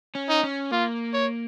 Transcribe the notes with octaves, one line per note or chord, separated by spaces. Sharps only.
C#4
D#4
C#4
A#3 F4
C#5